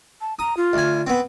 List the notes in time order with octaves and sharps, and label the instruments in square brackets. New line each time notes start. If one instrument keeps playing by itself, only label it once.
[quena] A5
[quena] A#5 [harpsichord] D#6
[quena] F4
[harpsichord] D2 G#5
B3 C4